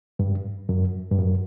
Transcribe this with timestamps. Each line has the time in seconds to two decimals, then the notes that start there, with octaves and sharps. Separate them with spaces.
0.19 G2
0.69 F#2
1.12 G2
1.19 F#2